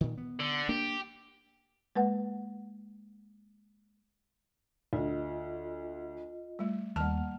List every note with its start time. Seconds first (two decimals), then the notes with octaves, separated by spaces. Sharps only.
0.01 A#2 D#3
0.18 B3
0.39 D3
0.69 A#3 D4 G4
1.96 G#3 A#3 B4 F#5
4.93 D2 F4 D#5
6.59 G3 A3
6.96 D#2 G3 A#3 F#5 A5 F6